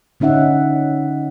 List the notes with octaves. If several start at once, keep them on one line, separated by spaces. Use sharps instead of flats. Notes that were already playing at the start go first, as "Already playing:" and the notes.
D3 C#4 D#4 E5 F#5